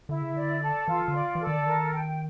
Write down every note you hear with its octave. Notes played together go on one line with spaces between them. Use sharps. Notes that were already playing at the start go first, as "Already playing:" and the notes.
D3 E4
C#3
D3 D5
A4
E3 F4
D3
D5
E3
A4
D#3
D3
D#3 A#4
G5